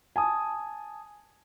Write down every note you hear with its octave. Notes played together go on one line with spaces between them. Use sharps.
G#5 A5 D#6